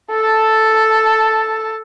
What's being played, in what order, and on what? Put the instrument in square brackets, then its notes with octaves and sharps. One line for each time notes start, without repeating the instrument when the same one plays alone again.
[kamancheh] A4 A5